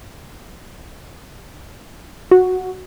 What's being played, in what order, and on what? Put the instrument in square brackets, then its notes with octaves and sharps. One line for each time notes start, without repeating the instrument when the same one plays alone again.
[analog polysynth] F#4